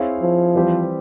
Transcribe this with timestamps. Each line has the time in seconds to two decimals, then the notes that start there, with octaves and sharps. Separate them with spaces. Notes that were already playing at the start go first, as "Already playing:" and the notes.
Already playing: C4 E4 G#4 C#5 F5
0.22 F3
0.55 E3 G3 C4 G4 C5